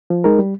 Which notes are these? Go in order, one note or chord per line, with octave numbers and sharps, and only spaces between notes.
F3
G#3 D#4 A#4
G3